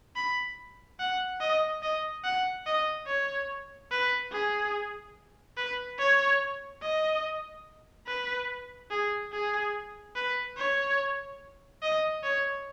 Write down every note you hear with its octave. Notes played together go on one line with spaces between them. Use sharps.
B5
F#5
D#5
D#5
F#5
D#5
C#5
B4
G#4
B4
C#5
D#5
B4
G#4
G#4
B4
C#5
D#5
C#5